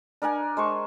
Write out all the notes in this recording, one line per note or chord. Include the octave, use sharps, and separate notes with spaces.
D4 A#4 F#5 G#5
G#3 C5 C#6